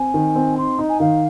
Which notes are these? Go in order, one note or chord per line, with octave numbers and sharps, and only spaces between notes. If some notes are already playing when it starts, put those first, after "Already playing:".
Already playing: C4 G#5
D#3
C4
D#4 C6
D#4
G#5
D#3 F5